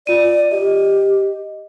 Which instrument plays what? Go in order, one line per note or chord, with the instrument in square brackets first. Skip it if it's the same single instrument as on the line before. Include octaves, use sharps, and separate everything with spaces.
[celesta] F4 D#7 [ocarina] D5
[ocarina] G4 [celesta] D#5